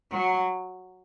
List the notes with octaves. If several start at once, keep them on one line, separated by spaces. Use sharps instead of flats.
F#3